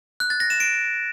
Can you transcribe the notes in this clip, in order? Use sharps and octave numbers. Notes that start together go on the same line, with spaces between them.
F#6
A6
A#6
E7
D7